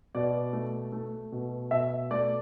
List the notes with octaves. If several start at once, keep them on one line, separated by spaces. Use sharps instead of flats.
B2 D5
A3
A3
B2
B2 E5
A3 D5